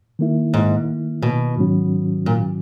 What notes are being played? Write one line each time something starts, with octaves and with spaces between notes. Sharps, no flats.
D#3 A#3 E4
G#2
B2
G#2 D#3 F#3 C#4 F#4
A#2